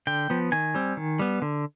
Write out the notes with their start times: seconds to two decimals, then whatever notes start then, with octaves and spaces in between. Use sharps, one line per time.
0.07 D3 G5
0.30 F3 B3
0.52 D#3 G#5
0.75 G3 C4
0.97 D#3
1.19 G3 B3
1.42 D3